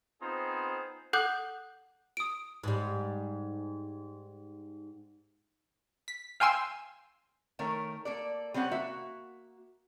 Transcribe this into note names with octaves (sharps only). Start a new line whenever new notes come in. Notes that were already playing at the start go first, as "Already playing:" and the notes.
B3 C4 D#4 F4 G#4 C5
A4 F#5 D6 F#6 G6 F#7
D#6 D7
G#2 G3
B6
F5 G5 G#5 C6 E6
D#3 A3 A#4 C#5
A#3 A4 D5
G3 C4 C#4 G4 F#5
A#3 F#4 E5